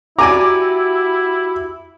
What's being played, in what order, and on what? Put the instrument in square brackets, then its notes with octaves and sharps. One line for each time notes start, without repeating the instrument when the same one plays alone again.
[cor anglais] E4 [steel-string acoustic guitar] F#4 G4 [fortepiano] D5 G#5 A#5 [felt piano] D6